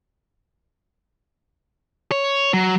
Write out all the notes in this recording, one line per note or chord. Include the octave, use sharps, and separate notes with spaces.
C#5
F#3